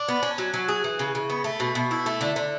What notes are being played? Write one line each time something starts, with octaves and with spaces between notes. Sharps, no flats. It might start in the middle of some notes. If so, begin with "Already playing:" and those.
Already playing: D4
B3
C#4
F#3
F#3
G#4
E3
C#3
C#3
B3
A3
B2
B2
E4
A3
D3
D3